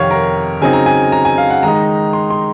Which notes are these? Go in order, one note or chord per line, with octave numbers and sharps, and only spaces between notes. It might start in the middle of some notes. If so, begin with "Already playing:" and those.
Already playing: F2 C3 D#3 C#5 F5 F#5
A#4
C#3 F#3 C4 D#4 G#5
A#5
G#5
A#5
G#5
F5
F#5
D#3 G#3 D#4 A#5
C6
C6